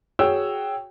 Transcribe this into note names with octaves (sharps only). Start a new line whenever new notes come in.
F#4 G#4 C#5 G5 E6